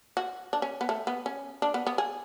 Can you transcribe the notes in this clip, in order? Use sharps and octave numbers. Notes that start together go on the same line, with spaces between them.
F#4
D4
C#4
B3
A3
B3
C#4
D4
B3
B3
G#4